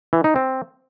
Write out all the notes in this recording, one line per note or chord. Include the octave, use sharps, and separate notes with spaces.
E3
D#4
C4